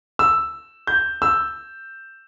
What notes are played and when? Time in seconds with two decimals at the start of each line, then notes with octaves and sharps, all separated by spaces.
0.19 E6
0.87 G6
1.22 E6